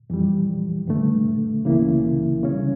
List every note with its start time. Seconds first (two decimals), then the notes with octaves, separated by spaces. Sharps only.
0.10 F2 E3 G3
0.88 G2 D3 A3
1.65 C#2 C#3 E3 A#3 E4
2.43 C#3 G3 C#4